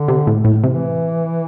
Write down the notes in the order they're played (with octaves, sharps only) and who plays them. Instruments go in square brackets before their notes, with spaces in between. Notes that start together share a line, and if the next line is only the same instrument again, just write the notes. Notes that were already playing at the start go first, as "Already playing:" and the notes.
Already playing: [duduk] D3
[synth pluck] C3
A2
A2
[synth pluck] C3 [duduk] E3